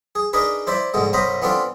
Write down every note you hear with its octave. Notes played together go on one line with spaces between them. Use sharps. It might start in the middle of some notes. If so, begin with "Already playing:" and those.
G#4
D4 D#4 G#4 A#4 B4
E4 C5 D5 E5
A#1 G#2 B2 D3 G#3
B1 F#2 C5 D#5 A#5 B5
E3 B3 C4 D4 F4 A4